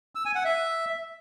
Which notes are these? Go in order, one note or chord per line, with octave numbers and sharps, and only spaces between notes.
E6
G#5
F#5
E5